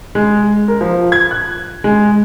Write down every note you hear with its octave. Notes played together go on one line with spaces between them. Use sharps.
G#3
A#4
F3
G#6
F#6
G#3